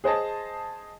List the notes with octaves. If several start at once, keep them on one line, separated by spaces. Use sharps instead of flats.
G#4 C5 D#5 A5